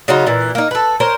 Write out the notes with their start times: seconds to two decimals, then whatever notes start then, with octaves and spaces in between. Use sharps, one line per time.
0.08 C#3 F#3 D#4 F4
0.27 A#2 E3
0.55 A#3 D#4
0.71 A4 B4
1.00 A#4 C5 C#5